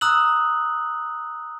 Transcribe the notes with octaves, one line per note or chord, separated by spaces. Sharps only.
A#5 D#6 E6 F#6 F#7